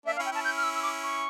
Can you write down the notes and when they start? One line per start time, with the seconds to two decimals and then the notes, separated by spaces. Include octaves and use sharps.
0.06 A#3 D4 E5
0.16 F5
0.19 C#4 E4
0.26 G5
0.31 C#4 E4 A5
0.45 G6
0.57 F6
0.64 E6
0.75 E6
0.83 D6
1.03 C#6